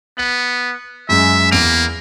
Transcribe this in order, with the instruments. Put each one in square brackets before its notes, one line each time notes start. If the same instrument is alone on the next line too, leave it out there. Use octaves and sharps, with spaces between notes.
[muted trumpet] B3 [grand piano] F#7
[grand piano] F#2 G#3 [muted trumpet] E5
[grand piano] E2 D7 F7 [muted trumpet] A#3